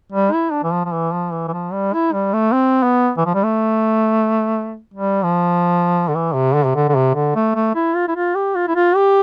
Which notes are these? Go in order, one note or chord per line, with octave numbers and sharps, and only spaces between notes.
G3
E4
D4
E3
F3
F3
E3
F3
E3
E3
F3
G3
E4
G3
A3
C4
B3
E3
F3
G3
A3
G3
F3
D3
E3
C3
D3
C3
D3
D3
C3
D3
A3
A3
E4
F4
E4
F4
G4
F4
E4
F4
G4